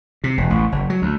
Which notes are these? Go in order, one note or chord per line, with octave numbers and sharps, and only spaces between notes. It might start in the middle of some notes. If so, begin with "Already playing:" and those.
C3
E1
A1
F#1
F#3
D2